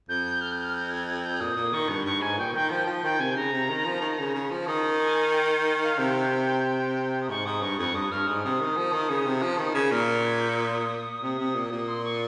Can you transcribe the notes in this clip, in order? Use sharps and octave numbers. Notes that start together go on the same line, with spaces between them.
F2 G6
F6
G6
F6
G6
G#6
G#6
G6
A#2 D#6
A#2
D#3 C#6
G2
G2 C#6
G#2 G#5
A#2 G5
D#3 G5
F3 G5
F3
D#3 G5
C3 G#5
C#3 A#5
C3
D#3
F3
D#3
C#3
C#3
F3
D#3 D#6
G#5
G5
G5
G5
F5
C3 G5
D#6
G#2 C#6
G#2 D#6
G2 C#6
F2 C#6
G2 D#6
G2 F6
G#2 D#6
C3 D#6
D#3
F3
D#3
C#3
C3
F3
D#3
C#3
A#2 F6
F6
G#6
G6
D#6
C3
C3
A#2
A#2
C6
C#6